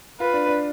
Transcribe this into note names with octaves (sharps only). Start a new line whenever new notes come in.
F4 B4
D4
D4